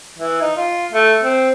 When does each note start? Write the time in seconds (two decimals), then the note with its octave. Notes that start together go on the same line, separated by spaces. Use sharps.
0.19 E3
0.41 D#4
0.57 F4
0.91 A3
1.23 C4